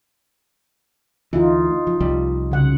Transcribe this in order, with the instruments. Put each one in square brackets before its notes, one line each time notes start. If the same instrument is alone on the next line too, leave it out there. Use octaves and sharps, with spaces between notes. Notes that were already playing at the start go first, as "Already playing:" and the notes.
[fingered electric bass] D2 E3 [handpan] D#4 F4
[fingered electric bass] F3
C2 F3 G3
[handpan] C#3 F#5